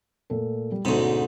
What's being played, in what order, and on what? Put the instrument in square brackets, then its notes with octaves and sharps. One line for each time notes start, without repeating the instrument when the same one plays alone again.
[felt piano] A#2 A3 A4
G3
[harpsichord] D2 G#2 [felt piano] B2 C#4